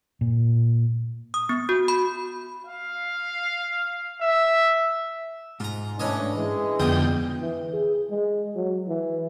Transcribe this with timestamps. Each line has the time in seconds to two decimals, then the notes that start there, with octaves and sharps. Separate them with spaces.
0.21 A#2
1.34 D#6
1.49 B3
1.69 F#4
1.88 B5
2.67 F5
4.21 E5
5.60 G#2 F4 A#5
5.99 A2 E3 C#4 D4 C#5 D#5
6.37 E3 G#3
6.80 F2 B2 D3 G#4 G5 D#6
7.42 E3
7.73 G#4
8.10 G#3
8.56 F#3
8.88 E3